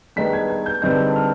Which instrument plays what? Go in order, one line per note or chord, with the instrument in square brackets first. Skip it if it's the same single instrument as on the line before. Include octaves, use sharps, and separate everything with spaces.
[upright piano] G2 D#3 G#3 B3 B6
G#6
G#6
G6
G2 D3 G#3 C4 D#4 G6
F6